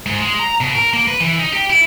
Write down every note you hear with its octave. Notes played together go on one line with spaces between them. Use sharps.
G#2
G#3
A#5
B2
A#4
A#3
B4
E3
D#4
G4
E4